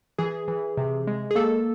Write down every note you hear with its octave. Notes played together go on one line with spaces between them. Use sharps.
E3 G#4
E3
C3
G#3
G#4
A#3 A4